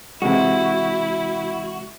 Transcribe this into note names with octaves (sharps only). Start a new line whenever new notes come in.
C3 E3 G#3 E4 F#4